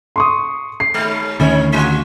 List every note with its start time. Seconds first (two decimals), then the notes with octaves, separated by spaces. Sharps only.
0.16 C6 C#6 D#6
0.80 C7
0.94 D#2 G#3
1.40 D2 D#3 A3 C#4 D#4 C#5
1.72 G3 F4 F#4